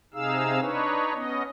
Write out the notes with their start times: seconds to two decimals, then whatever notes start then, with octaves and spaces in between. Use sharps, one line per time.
0.14 C3 D#4 G#4 F5 E6
0.60 D4 D#4 B4 C#5
1.13 B3 C#4 D#5